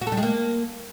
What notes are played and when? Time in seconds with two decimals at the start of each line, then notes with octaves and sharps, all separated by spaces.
0.01 F#4
0.07 A4
0.12 G3
0.17 G#3
0.23 A#3